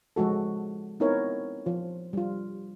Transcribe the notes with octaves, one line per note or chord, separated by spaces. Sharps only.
F3 G#3 F#4 A4
B3 C4 D#4 E4 A#4 C#5
F3 F4
G3 F4